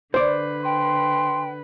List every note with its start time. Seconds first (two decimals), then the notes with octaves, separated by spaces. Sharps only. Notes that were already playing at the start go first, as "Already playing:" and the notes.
0.14 D3 B4 C5 D5
0.65 G5 C6